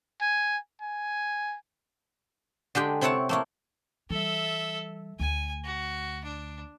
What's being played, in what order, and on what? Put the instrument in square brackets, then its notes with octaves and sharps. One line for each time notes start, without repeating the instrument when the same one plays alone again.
[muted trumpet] G#5
G#5
[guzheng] D3 G#3 G4 G5
C3 C4 E4 C#5 F#5 A5
A3 A#3 E4
[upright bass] E3 G3 [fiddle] A4 E5
[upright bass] D2 [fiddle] G#5
[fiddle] F#4
D4